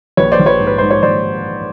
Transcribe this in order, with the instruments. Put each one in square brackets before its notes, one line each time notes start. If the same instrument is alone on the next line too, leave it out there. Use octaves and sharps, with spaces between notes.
[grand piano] A#1 B4 C#5
C5 D5
A#1
B4 C#5
G#2
B4
G#2 C5
C#5
A#1 C5 D5